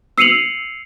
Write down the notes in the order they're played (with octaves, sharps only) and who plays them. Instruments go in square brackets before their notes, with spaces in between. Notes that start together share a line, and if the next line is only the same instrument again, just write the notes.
[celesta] E6 C7 C#7 D#7 F7 F#7